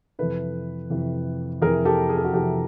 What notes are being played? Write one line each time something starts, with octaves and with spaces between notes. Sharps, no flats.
F2 C3 E3 A4 B4
F2 C3 E3
F2 C3 E3 G#4 A#4
G4 A4
G#4
A4
F#4 G#4
F2 C3 E3 G4 A4